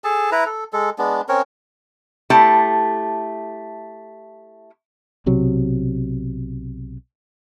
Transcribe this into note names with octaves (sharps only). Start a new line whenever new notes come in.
G#4 A4 A5
E4 B4 A#5
A4
G#3 A4
G#3 B3 D4
C4 C#4 A#4 C#5
A3 E4 G4 A5
B1 C3 F#3